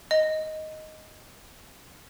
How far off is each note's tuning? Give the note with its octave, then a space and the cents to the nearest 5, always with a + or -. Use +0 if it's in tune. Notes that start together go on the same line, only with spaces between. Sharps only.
D#5 +5